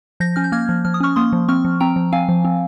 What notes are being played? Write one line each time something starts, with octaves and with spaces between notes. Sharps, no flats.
F3 G6 A#6
C#4 F6
G6
A#3 F6 G#6
F3
F3 F6
D#6
C#4 C#6 F6
A#3 C6 D#6
F3
C4 C#6 F6
F3
C4 G5 A#5
F3
C4 F5 G#5
F3
C4